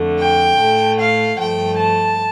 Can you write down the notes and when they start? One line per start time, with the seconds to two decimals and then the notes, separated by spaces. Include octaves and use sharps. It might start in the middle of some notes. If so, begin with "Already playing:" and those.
Already playing: F2 D3 A3
0.19 G5
0.58 A2 A3
0.98 F5
1.38 G2 F3 A3 G5
1.78 A5